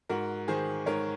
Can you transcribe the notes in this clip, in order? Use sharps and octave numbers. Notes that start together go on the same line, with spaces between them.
G#2 F#4 A#4
D#3 G#4 C5
G#2 A#4 C#5